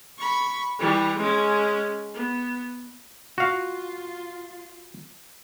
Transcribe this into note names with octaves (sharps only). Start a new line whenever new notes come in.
B5 C#6
E3 G3
G#3 C#4
B3
F4 F#4 F5